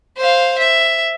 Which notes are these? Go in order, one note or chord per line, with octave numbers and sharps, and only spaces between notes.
C5 F5
E5